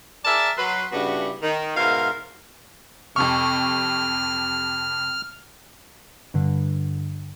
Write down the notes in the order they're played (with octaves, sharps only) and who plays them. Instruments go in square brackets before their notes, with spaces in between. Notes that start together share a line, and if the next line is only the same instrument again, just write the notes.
[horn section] G#4 A#4 D5 E5 A5
F#3 B4 C6
G2 C#3 B3 D4 E4 F#4
D#3
G#2 B2 A#4 C5 E5 F5
[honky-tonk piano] F2 C3 C#6 [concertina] F6
[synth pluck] G2 D3